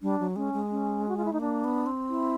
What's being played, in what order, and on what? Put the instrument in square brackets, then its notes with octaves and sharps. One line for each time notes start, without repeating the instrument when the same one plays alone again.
[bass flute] G3 [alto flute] D4
[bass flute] F#3
[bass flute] G#3 [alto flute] C#4
[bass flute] G#3
[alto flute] C#4
F#4
F4
E4
[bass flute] A3 [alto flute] D#4
[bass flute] A#3 [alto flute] D4
[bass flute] B3
C4
[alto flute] E4